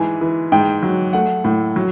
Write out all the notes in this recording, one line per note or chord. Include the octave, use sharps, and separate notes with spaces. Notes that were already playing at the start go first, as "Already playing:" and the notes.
Already playing: G#2 E3 G#5
E3
G#2 G5
F#3
A3 F#5
A2
F#3